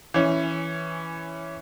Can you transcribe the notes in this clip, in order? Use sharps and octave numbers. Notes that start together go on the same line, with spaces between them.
E3 C#4